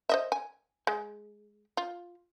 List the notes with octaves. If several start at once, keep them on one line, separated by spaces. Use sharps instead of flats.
C5 D#5 E5
G#5
G#3
F4